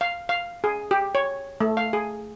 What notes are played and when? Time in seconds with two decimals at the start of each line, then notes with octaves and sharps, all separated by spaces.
0.01 F5
0.29 F5
0.64 G#4
0.91 G4
1.15 C#5
1.60 A3
1.77 F5
1.93 G#4